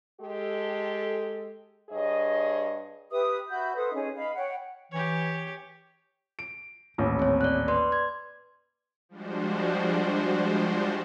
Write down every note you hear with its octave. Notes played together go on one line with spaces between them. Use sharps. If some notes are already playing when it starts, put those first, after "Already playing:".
G#3 G4 A4
G2 G#4 C#5 D#5
G4 B4 E5 D#6
F#4 E5 B5 G6
A4 B4 C5 D#6
C#4 D#4 G#4
D#5 F5 B5
C#5 F#5 G5
E3 G4 C#5
D7
D#1 A1
C4 C#5
D5 F#6
B4 D5 C6
G#6
F3 G3 G#3 D4 F#4 C5